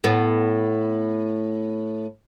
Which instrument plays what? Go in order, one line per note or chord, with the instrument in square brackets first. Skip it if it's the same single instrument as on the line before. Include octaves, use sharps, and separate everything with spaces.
[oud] A2 B3